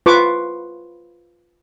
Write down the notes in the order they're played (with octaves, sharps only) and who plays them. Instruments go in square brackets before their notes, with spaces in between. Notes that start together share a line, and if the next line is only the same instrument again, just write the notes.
[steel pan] F4 B4 C#6 D6